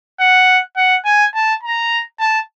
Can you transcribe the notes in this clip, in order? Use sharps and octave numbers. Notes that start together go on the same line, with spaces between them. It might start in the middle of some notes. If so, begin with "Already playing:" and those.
F#5
F#5
G#5
A5
A#5
A5